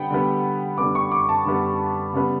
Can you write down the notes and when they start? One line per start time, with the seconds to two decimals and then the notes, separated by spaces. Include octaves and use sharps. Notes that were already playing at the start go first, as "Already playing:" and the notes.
Already playing: D3 G3 B3 F#5 G5
0.11 D3 G3 B3
0.78 D3 G3 B3 D6
0.95 C#6
1.12 D6
1.29 A5
1.45 D3 G3 B3
2.13 C#3 G3 B3